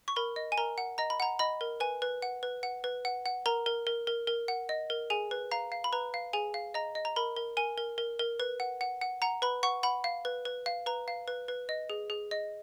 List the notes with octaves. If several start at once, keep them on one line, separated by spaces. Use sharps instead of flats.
C#6
A#4 B5
D#5
G#5
A#4 A#5
F#5
D#5 A#5
B5
F#5 A#5
D#5 B5
A#4
B4 G#5
B4
F#5
B4
F#5
B4
F#5
F#5
A#4 A#5
A#4
A#4
A#4
A#4
F#5
D#5
A#4
G#4 G#5
B4
F5 A#5
F5
B5
B4 A#5
F5
G#4 G#5
F5
D#5 A#5
D#5
A#5
A#4 B5
A#4
A#4 G#5
A#4
A#4
A#4
B4
F#5
F#5
F#5
F#5 A#5
B4 B5
F#5 C#6
F#5 B5
F5
B4
B4
F5
B4 A#5
F5
B4
B4
D#5
G#4
G#4
D#5